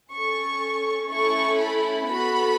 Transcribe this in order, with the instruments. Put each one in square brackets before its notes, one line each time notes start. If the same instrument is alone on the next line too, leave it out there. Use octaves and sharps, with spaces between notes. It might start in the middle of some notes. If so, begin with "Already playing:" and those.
[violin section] C#4 A4 C#6
A3 C#4 E4 A4 C#6
B5
B3 F#4 A4 B5